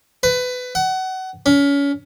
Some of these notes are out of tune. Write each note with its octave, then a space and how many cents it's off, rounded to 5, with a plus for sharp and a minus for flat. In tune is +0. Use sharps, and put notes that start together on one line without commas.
B4 +20
F#5 +25
C#4 +30